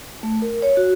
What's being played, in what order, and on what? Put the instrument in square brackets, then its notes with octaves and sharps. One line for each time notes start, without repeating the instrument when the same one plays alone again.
[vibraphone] A3
A#4
C#5
F#4